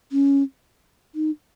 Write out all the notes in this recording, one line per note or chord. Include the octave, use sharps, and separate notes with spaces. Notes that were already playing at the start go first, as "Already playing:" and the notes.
C#4
D#4